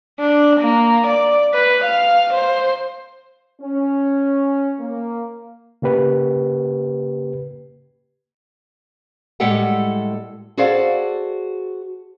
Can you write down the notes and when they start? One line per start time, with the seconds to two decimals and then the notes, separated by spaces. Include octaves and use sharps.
0.20 D4
0.61 A#3
1.07 D5
1.54 B4
1.85 F5
2.34 C5
3.62 C#4
4.80 A#3
5.82 C#3 A#3 G4 B4
9.40 A2 G3 G#3 G4 A4 F#5
10.57 F#4 G#4 A4 C5 D5 F5